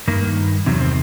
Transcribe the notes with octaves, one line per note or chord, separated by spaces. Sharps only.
G2 D#3 A#3
E2 C3 D#3 F#3
C4